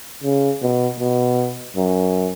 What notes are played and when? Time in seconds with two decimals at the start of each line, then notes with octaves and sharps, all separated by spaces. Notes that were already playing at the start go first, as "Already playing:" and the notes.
0.23 C#3
0.62 B2
1.00 B2
1.76 F#2